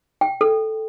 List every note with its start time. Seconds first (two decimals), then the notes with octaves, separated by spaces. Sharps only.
0.21 G5
0.41 A4